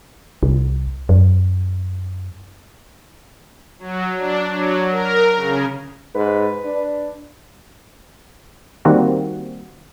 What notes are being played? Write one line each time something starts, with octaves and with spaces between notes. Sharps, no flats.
C2
F#2
F#3
D4
F#3
A#4
C#3
G#2 B4
D4
D#3 G3 A#3 C4 F#4